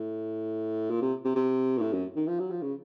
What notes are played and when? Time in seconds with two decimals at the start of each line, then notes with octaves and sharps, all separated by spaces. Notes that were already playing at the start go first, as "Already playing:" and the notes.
Already playing: A2
0.90 A#2
1.01 C3
1.25 C3
1.35 C3
1.78 A#2
1.81 A2
1.93 F#2
2.16 D#3
2.28 F3
2.39 F#3
2.51 F3
2.62 C#3